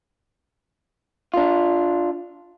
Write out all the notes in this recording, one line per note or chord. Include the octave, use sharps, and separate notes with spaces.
D4 F4